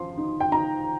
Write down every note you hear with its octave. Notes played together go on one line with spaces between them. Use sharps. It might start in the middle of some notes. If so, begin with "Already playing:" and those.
Already playing: F3 C6
D#4
G5
D#4 A#5